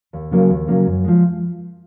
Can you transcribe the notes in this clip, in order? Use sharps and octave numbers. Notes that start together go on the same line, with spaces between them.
D#2
C#3 F#3 A#3 C#4
D#2
C#3 F#3 A#3 C#4
F#2
F3 G#3